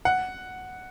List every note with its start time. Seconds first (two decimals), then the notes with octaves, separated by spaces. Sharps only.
0.05 F#5